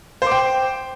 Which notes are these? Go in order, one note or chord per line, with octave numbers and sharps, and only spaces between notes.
C5 G5 D6